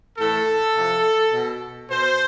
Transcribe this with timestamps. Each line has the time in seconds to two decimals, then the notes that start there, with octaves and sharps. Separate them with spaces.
0.19 A2 E3 A4
0.76 C3 F3
1.32 B2
1.89 B2 C5